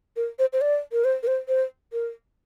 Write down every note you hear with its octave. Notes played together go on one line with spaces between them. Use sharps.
A#4
C5
C5
D5
A#4
C5
A#4
C5
C5
A#4